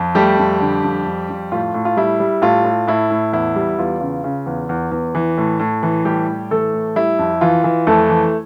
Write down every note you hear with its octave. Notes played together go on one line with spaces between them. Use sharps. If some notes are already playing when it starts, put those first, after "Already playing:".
Already playing: F2
G3 A3 G4
F2
D3
F2
F2
F2
A2 F4
A2
F4
G3 E4
G3
A2 F4
A2
A2 E4
A2
E2 E4
G3
E2 F4
C#3
C#3
E2
E2
E2
E3
A2
A2
E3
A2 G3 G4
A2
E3 A3 A4
A2
G3 E4
F2
E3 F4
E3
F2 A3 A4
E3